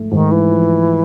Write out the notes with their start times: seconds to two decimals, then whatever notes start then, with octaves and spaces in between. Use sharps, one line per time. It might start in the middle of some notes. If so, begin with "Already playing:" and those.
Already playing: G#2 F3 A3
0.11 G#2 D#3
0.31 E3
0.51 F3